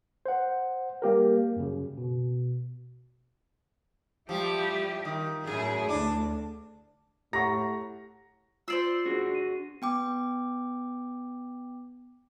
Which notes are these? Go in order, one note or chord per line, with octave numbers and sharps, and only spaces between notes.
C5 F#5
G3 A#3 G4 A#4
F#2 C#3
B2
F3 G3 E4 G4
D#3
F#2 A2 E4 G#4
D2 D4
A2 G4 F#5 A#5 C#6 A#6
F4 C5 D5 E6 C7
D4 F#4 G#4
D#7
B3 G5 D6